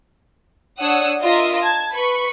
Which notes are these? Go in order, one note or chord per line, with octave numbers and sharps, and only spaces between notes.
D4 C#5 F#5 D#6 E6
F4 A#4 D#5 E5
A5 G#6
B4 B5 C#6